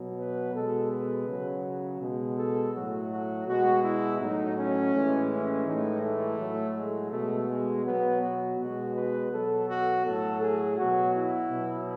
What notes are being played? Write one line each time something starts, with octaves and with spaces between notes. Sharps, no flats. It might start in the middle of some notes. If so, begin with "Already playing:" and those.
Already playing: B2 F#3
B4
B2 G#3 A4
B4
C#3 F#3
B2 G#3
A4
A2 F#3 F#4
F#4
B2 G#3 F#4
E4
A2 F#3 D#4
C#4
A2 E3 G#3
C#4
A2 E3 G#3 D#4
A3
A2 F#3
G#3
B2 G#3 A3
G#3
B2 F#3 B3
F#4
B2 G#3 F#4
B4
B2 F#3 A4
F#4
A2 F#3 A4
G#4
B2 F#3 F#4
E4
B2 F#3